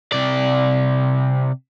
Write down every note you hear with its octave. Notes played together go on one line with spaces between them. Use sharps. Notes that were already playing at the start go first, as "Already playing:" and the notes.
C3 D5